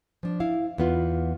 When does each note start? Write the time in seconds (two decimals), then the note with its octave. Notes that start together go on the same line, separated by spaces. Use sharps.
0.23 F3 D4
0.40 E4 F5
0.78 E2 B3 F4